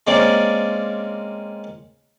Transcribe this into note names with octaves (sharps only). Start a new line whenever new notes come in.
G#3 A#3 C4 C#4 D5